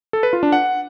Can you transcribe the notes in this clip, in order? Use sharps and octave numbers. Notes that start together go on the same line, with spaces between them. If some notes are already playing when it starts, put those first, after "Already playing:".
A4
B4
F4
D4
F#5